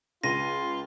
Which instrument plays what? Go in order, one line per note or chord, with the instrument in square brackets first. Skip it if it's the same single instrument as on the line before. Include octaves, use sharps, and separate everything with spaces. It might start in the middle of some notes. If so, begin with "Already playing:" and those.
[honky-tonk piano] C#2 D#7 [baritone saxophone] F4 [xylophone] A#6